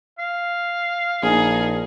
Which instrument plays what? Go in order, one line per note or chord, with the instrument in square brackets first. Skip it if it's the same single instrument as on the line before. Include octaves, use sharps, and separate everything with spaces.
[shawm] F5
[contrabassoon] A#1 [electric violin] D#4 G#4